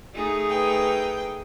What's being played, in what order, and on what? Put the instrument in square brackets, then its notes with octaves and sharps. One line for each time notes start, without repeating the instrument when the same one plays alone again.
[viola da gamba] A3 D#4 G#4
[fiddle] B4 G5